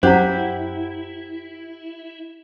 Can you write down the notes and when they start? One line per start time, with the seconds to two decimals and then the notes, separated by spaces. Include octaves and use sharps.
0.03 F#2 E4 G4 C5 F#5 A#5